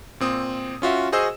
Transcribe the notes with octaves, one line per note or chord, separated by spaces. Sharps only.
A#2 C4 D#6
C#4 F4 F#4 E5
F#4 G#4 C5 D#5 E6